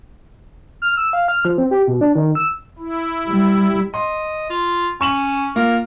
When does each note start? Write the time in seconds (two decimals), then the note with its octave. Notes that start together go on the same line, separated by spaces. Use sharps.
0.82 F6
0.97 E6
1.13 F5
1.28 F6
1.45 F3
1.58 C4
1.71 G4
1.88 B2
2.01 D4
2.15 D#3
2.35 E6
2.79 E4
3.27 G3
3.94 D#5 C6
4.50 F4
5.01 C#4 C#6 E7 F#7
5.56 A#3 F4 A#4